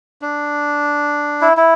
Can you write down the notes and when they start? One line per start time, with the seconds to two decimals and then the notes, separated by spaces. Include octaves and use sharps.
0.22 D4
1.41 E4
1.57 E4